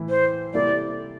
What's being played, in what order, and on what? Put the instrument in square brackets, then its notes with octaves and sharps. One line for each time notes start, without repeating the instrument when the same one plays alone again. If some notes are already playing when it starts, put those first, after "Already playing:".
Already playing: [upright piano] A2 E3 E4
[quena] C5
[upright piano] C3 G3 A#3 E4 A4 [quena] D5